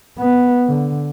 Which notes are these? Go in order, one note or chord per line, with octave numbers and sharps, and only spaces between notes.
B3
D3